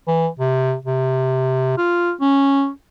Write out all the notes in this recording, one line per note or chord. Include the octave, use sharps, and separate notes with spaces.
E3
C3
C3
F4
C#4